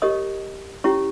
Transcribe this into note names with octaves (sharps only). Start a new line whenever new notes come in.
G4 A#4 C#5 D#5 D#6
C#4 E4 G4 C#5 C#6